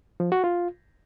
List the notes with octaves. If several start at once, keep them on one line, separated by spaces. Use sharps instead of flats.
F3
F#4
F4